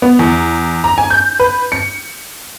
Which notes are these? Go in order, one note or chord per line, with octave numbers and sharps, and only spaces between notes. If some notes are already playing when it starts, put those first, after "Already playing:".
B3
E2
A#5
G#5
G6
B4
C#7